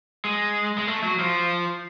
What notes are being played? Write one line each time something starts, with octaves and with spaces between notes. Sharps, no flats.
G#3
G#3
A3
F#3
F3